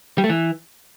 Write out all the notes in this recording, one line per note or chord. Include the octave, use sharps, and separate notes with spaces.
G3
A3
E3